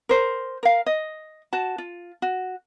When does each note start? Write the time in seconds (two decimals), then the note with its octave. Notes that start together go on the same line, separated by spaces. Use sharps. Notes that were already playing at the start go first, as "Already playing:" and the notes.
0.09 A#4 C5
0.63 A#4 F5
0.86 D#5
1.53 F#4 A5
1.78 F4
2.22 F#4